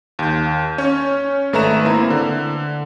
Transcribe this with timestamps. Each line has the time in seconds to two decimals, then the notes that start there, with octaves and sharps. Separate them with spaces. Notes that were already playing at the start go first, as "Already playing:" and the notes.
0.19 D#2 G6
0.78 C#4 C#5
1.53 G#1 A3 B4 E5 A#5 E7
1.85 A#3 C4 E4
2.10 D3